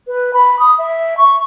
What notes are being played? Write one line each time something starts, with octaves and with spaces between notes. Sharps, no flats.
B4
B5
D#6
E5
C#6